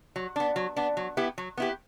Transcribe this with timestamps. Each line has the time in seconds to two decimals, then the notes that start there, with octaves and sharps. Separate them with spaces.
0.16 F#3
0.36 B3 D4
0.56 F#3
0.76 B3 D4
0.97 F#3
1.17 B3 E4 G4
1.38 F#3
1.57 B3 E4 G4